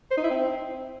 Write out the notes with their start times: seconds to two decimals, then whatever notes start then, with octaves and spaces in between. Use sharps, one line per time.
0.11 C5
0.17 D#4
0.24 E4
0.30 C4